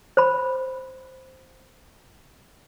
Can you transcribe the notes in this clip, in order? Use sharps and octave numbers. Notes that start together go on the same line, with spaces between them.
C5 B5